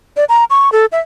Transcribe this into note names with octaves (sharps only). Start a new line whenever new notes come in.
D5
A#5
C#6
A4
E5